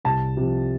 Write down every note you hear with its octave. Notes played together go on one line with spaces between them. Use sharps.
C2 A5
C3 F3